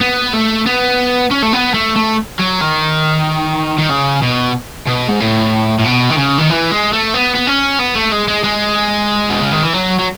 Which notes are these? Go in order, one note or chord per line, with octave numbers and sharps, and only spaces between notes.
B3
A3
B3
C#4
A3
B3
A3
A3
F#3
D#3
D#3
C#3
B2
B2
G#2
A2
A2
B2
D#3
C#3
D#3
E3
G#3
A3
B3
B3
C#4
B3
A3
G#3
G#3
G#3
B2
C#3
D#3
E3
F#3
F#3